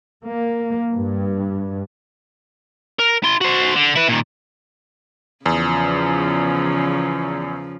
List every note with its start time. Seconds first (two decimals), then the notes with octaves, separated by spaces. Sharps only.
0.23 A#3
0.92 G2
2.99 A#4
3.24 E4 C6
3.41 F#4 C5
3.76 D3
3.96 E4 B4
4.09 A#2 D#3
5.46 E2 C#3 F3